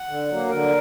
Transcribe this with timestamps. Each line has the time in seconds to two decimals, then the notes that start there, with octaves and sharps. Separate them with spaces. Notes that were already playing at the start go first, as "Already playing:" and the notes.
Already playing: F#5
0.09 D3
0.29 F#3 A#3
0.50 D3 A#4